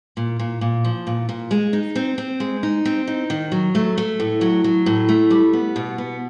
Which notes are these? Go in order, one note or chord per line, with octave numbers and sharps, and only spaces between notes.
A#2
A#2
A#2
F3
A#2
A#2
G#3
D#4
C4
C4
G#3
D#4
C4
D#4
D#3
F#3
A3
A3
A2
F#3
F#3
A2
A3
G3
B3
B2
B3